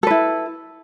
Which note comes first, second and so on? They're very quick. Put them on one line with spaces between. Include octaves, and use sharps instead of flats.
A4 B4 E4